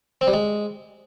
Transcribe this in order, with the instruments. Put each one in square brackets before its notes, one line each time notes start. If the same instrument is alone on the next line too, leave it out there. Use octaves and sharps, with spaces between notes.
[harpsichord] C4
G3
G#3